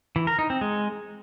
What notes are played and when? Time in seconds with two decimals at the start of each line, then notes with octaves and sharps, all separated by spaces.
0.16 E3
0.27 A#4
0.39 D#4
0.50 C4
0.61 G#3